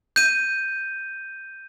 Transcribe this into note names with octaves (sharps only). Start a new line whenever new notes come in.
G6 D#7